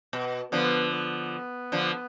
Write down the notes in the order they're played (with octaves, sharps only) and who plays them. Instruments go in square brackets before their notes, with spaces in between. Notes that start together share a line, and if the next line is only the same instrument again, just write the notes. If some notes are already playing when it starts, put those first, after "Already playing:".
[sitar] B2
[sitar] D3 F3 [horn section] B3
[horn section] B3
[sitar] D3 F3